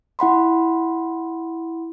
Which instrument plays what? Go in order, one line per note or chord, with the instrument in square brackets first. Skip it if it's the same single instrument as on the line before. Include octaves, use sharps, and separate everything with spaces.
[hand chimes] E4 F#5 B5 C6